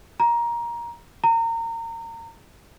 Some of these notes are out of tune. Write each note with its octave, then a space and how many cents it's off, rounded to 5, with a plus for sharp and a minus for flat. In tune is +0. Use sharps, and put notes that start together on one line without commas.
A#5 +15
A#5 -30